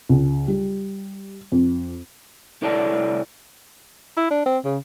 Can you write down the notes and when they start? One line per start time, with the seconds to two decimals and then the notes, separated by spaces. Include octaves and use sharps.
0.09 C#2
0.48 G3
1.52 F2
2.62 C2 E4 A4 C#5 D5 A5
4.17 E4
4.31 D4
4.46 C4
4.65 C#3